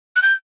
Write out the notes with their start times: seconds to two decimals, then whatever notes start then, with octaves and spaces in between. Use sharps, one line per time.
0.16 F#6
0.23 G6